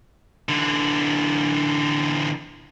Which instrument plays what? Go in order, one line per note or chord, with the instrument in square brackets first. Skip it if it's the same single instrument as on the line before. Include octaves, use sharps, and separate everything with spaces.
[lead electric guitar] D3 E3